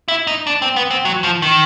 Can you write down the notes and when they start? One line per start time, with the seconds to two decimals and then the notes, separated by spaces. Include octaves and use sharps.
0.08 E4
0.27 D#4
0.47 D4
0.62 C4
0.76 B3
0.91 C4
1.05 F#3
1.24 F3
1.42 D#3